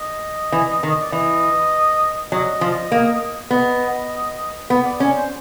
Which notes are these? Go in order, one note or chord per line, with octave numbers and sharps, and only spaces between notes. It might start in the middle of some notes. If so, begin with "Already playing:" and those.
Already playing: D#5
E3
D#3
D5
E3 D#5
F#3 D#5
F3
A#3
B3 D#5
B3
D5
C#4
C5